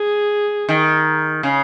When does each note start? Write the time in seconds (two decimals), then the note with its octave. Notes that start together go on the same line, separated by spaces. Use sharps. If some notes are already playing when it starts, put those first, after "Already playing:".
Already playing: G#4
0.69 D#3
1.43 C#3